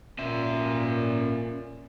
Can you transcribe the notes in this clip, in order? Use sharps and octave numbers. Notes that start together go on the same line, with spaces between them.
A#2 C#4 E5